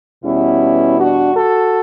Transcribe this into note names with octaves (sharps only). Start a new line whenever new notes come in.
E2 B2 G3 B3 C#4 E4
D4 F#4
F#4 A4